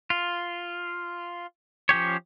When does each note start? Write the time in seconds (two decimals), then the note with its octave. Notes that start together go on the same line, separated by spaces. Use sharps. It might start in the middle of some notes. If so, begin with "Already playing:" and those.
0.10 F4
1.89 F3 C#4 G4 C#5